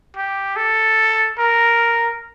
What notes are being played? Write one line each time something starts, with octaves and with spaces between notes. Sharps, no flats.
G4
A4
A#4